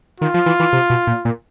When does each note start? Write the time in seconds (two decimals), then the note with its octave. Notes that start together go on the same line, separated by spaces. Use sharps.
0.20 D#3 F4
0.34 F3
0.46 E3
0.60 E3
0.73 C3
0.90 B2
1.07 A#2
1.25 A#2